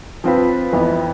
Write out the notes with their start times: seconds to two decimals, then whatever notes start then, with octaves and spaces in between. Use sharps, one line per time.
0.24 F3 C4 F4 B4
0.73 F2 E3 B3 E4